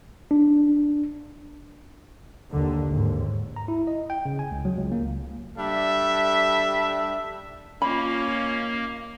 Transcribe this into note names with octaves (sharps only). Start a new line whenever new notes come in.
D4
D#2 D3
D#2 G#2
A#5
E4
D#5
G5
C#3
G#5
C#2
F#3
C#2
A#3
G3 D4 A4 E5
A#2 D#3 A#3 C#4 F4 B5